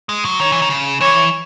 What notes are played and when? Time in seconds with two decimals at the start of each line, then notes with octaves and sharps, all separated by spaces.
0.09 G#3
0.25 F#3
0.40 D#3 C#5
0.52 E3
0.62 D#3
0.70 C#3
1.01 E3 C#5